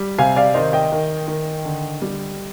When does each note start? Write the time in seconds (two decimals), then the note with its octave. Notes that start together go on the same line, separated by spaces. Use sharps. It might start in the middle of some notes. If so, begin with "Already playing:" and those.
Already playing: G3
0.18 C3 F5 G#5
0.36 D5 F5
0.54 D#3 C5 D#5
0.73 D#5 G5
0.92 D#3
1.28 D#3
1.65 D3
2.02 G3